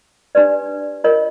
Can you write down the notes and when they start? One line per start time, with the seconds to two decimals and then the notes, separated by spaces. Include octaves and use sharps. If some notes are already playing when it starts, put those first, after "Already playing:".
0.35 D4 G4 B4 D5
1.04 F4 A#4 C#5 D#5